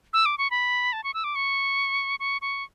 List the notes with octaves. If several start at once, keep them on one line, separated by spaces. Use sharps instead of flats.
E6
D6
C#6
B5
A5
C#6
E6
D6
C#6
C#6
C#6